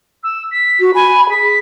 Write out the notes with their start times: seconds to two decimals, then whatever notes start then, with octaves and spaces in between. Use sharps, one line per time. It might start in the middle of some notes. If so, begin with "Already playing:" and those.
0.23 E6
0.51 B6
0.80 F#4
0.94 G#5 B5
1.29 G#4 B6